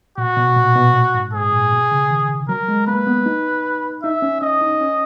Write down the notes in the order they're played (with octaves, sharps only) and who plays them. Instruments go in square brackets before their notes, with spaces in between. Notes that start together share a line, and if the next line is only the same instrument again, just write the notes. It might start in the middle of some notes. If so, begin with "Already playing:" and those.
[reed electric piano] A#2 [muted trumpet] F#4
[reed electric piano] B2
A#2
B2
A#2
G#2
[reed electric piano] G#2 [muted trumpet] G#4
[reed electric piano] A#2
B2
C#3
D#3
[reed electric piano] F#3 [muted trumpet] A#4
[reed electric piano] G#3
[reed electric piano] A#3 [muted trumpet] B4
[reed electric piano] B3
D#4
[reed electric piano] D#4 [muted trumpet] E5
[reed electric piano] C#4
[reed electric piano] C#4 [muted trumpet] D#5
[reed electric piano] D#4
C#4